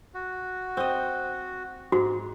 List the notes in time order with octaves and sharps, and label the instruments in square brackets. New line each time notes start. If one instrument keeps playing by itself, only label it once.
[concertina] F#4
[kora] C4 D#5
[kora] G#2 [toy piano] F#4